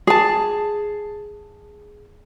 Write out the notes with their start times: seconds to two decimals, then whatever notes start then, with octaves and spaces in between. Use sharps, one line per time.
0.07 G#4 A5